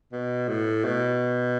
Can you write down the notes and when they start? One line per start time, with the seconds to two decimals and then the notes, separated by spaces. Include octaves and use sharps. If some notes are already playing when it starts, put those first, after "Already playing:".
0.12 B2
0.49 A2
0.85 B2